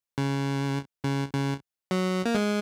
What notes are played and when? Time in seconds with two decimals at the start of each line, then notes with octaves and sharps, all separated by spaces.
0.18 C#3
1.04 C#3
1.33 C#3
1.91 F#3
2.25 A#3
2.35 G#3